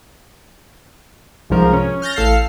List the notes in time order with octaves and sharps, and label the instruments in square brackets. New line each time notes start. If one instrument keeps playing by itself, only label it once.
[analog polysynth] C2 G#2 F3 A#4
C#4
F6 G6 A6 A#6
A1 A4 F5 F6 C7